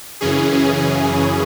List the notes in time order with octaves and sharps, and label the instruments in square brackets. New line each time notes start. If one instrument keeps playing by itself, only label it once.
[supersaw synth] F#2 C#3 E3 C#4 G#4